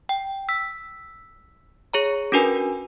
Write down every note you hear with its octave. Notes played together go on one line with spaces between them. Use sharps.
G5
E6 B6
G#4 C#5 A#5
C#4 D4 F#4 A#4 B4 G#5